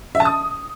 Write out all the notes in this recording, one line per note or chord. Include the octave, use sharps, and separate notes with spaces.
E5
A5
D#6